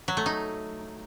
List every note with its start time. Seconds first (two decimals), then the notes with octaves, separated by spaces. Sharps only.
0.08 F#3
0.17 A3
0.26 D#4